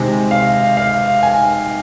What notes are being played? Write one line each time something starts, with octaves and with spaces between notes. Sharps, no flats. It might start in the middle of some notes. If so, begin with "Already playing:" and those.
Already playing: C3 D#3 G#3
F5
F5
G#5